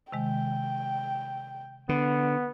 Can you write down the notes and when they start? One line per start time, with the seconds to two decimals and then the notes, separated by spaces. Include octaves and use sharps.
0.12 C3 D#3 G#3 G5
1.89 D3 B3